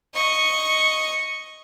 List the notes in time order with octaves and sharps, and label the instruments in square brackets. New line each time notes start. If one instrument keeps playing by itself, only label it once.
[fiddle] D#5 C#6